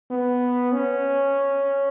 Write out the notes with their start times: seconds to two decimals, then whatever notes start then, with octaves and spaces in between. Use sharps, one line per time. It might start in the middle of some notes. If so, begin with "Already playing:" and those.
0.11 B3
0.72 C#4